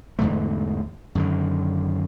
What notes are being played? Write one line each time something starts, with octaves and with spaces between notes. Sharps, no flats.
E2 G#2 D3 A3
F#2 D3 D#3